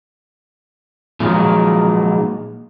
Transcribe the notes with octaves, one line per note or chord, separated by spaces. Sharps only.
A#2 D#3 F3 F#3 G#3